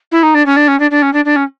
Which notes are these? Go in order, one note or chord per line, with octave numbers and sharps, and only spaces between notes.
E4
D#4
D4
C#4
D4
C#4
D4
D4
C#4
D4
D4
C#4